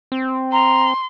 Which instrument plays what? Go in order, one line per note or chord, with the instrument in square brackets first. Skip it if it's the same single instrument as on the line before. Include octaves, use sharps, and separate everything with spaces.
[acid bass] C4
[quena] A#5 [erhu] C6